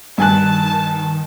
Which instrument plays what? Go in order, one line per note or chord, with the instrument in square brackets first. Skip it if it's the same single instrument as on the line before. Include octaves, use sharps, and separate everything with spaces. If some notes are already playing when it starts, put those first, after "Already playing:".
[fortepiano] G2 G#5 F#6 [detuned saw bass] D#3 [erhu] A5